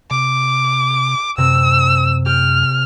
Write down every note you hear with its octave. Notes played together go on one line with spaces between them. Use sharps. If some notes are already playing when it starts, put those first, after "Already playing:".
C3 D6
F#2 C3 E6
G4 F6